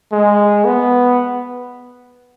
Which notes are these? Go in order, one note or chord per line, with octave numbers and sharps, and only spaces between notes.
G#3
B3